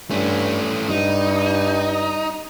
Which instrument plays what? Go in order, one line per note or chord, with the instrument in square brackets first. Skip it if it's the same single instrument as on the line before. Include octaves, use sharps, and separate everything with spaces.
[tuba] G2 [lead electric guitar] A3 C#4
[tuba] G2 [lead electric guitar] D#4